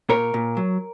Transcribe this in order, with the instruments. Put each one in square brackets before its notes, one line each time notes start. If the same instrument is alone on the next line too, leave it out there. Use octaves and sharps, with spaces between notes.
[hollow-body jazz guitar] A#2 A#4 C#5
A#2
F#3